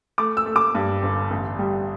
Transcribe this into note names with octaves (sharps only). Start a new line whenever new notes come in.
A3 D6
E6
A3
D6
G2
G1
A1
G3